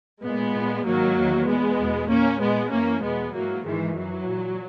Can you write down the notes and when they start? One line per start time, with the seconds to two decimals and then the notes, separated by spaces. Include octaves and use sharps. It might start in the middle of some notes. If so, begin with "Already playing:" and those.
0.24 A#2 G#3 B3
0.55 A#2
0.86 G#2 D#3 F#3 A#3
1.17 E2 D#3
1.48 A#2 G#3 B3
1.79 E2 B2
2.10 A#2 A#3 C#4
2.41 A#2 G#3 B3
2.72 F#2 E3 A#3 C#4
3.03 E2 B2 G#3 B3
3.34 G#2 E3 F#3 A#3
3.65 G#2 D#3 E3 G#3
3.96 F#2 E3 F#3
4.27 A#2